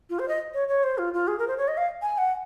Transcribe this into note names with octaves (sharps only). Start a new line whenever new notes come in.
F4
C5
D#5
C#5
C#5
C5
F4
F4
G#4
A#4
C5
C#5
D#5
F5
G#5
F#5